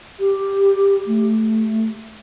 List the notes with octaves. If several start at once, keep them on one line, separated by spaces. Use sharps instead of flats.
G4
A3